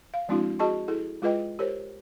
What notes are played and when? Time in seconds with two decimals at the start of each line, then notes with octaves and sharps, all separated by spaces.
0.14 F5
0.28 F3 G#3 C4 D4 E4 F#4
0.59 F#4 G#4 D#5 A5 C#6
0.88 E4 G#4 A4
1.22 G#3 F4 G#4 B4 D#5 G5
1.59 G4 A#4 C5 C#5